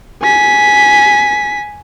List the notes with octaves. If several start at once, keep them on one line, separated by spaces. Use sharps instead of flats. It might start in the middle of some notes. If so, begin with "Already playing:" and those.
G#5 B6